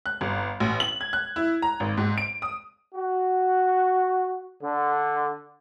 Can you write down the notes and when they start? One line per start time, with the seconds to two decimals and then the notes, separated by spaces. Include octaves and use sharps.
0.06 F#6
0.21 G1
0.60 A1
0.80 F#7
1.01 G#6
1.13 F#6
1.36 E4
1.62 A#5
1.80 G#1
1.97 G#2
2.18 D7
2.42 D#6
2.95 F#4
4.63 D3